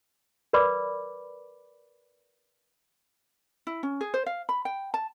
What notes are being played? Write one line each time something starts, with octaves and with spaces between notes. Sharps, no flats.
A#4 B4 D5 B5 D6
E4
C#4
G#4
C5
F5
B5
G5
A5